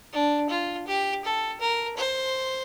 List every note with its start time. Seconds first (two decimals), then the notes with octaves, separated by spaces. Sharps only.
0.13 D4
0.50 F4
0.87 G4
1.25 A4
1.61 A#4
1.97 C5